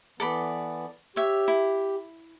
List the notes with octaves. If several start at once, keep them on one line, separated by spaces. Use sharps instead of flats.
E3 B3 A4 D5 B5
G4 C#5 E5
E4